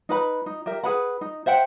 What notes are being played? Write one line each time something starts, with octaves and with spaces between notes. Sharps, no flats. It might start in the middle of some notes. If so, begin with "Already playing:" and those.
D#4 B4 B5
D#4
G4 A#4 E5
G#4 B4 F#5 B5
D#4
C5 E5 F#5 G5